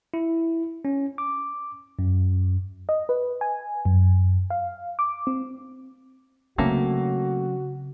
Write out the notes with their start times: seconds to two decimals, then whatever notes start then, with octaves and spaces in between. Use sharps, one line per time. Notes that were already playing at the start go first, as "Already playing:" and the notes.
0.14 E4
0.85 C#4
1.18 D6
1.99 F#2
2.89 D#5
3.09 B4
3.41 G#5
3.85 F#2
4.50 F5
4.99 D6
5.27 C4
6.58 C#3 F#3 A3 A#3 C4 C#4 F#4